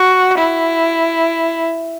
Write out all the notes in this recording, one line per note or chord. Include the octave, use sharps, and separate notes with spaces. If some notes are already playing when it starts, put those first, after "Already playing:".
Already playing: F#4
E4